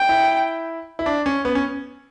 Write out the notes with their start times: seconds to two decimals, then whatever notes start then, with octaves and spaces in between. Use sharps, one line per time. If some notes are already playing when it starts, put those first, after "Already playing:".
Already playing: G5
0.09 E4
0.99 E4
1.06 D4
1.26 C#4
1.45 B3
1.55 C#4